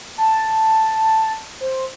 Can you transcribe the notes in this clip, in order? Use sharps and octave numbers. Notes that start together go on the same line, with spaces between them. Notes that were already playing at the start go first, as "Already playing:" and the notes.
A5
C5